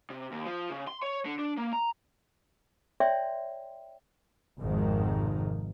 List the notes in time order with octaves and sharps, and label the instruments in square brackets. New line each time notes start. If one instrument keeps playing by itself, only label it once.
[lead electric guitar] C3
D#2
F3
C#3
C6
C#5
D3
D4
A#3
A#5
[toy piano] C#5 D5 E5 G5 C6
[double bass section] G#1 F2 G#2 C3 D#3